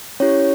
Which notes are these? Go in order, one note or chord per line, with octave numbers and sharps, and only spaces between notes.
C#4 E4 G4 C#5